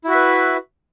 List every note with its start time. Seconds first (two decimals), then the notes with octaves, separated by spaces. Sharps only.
0.04 E4
0.08 F#4
0.11 E5
0.15 B4